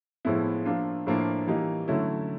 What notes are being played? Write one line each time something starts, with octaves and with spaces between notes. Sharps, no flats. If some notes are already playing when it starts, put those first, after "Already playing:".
A2 F3 G#3 B3 E4
F3 A#3 D4 F4
A2 F3 A#3 D4 F4
E3 G3 A#3 D#4
D3 F#3 A3 C#4 E4